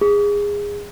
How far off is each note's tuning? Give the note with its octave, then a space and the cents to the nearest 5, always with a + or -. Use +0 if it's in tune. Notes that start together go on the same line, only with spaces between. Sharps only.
G#4 -20